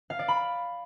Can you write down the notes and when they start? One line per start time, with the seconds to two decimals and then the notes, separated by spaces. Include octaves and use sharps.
0.10 F5
0.19 D5
0.28 B5